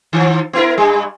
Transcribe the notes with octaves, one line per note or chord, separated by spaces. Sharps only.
D#3 F3
B3 E4 A#4
G2 G3